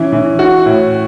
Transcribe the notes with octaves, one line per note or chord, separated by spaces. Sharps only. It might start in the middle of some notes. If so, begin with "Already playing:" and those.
Already playing: E3 C#4
E3
F#4
A2